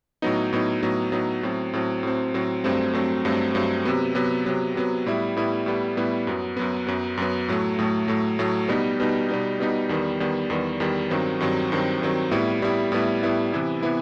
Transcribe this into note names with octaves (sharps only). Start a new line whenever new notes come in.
A2 F#3 B3 D#4
A2 F#3 B3 D#4
A2 F#3 B3 D#4
A2 F#3 B3 D#4
A2 F#3 C4
A2 F#3 C4
A2 F#3 C4
A2 F#3 C4
G2 F#3 A3 C4
G2 F#3 A3 C4
G2 F#3 A3 C4
G2 F#3 A3 C4
C3 F#3 B3
C3 F#3 B3
C3 F#3 B3
C3 F#3 B3
A2 G3 B3 E4
A2 G3 B3 E4
A2 G3 B3 E4
A2 G3 B3 E4
F#2 F#3 B3
F#2 F#3 B3
F#2 F#3 B3
F#2 F#3 B3
A2 F#3 A3
A2 F#3 A3
A2 F#3 A3
A2 F#3 A3
B2 G3 B3 D#4
B2 G3 B3 D#4
B2 G3 B3 D#4
B2 G3 B3 D#4
E2 D#3 G3 B3
E2 D#3 G3 B3
E2 D#3 G3 B3
E2 D#3 G3 B3
G2 D#3 F#3 C4
G2 D#3 F#3 C4
G2 D#3 F#3 C4
G2 D#3 F#3 C4
A2 G3 B3 E4
A2 G3 B3 E4
A2 G3 B3 E4
A2 G3 B3 E4
C3 E3 B3 E4
C3 E3 B3 E4